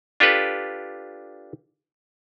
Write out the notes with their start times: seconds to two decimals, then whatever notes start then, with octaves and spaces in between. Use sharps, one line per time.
0.20 D4 F4 G4 A4 B4